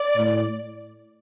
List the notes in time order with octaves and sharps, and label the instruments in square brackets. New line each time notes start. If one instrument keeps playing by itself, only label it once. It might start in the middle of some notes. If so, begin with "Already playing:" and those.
Already playing: [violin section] D5
[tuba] A2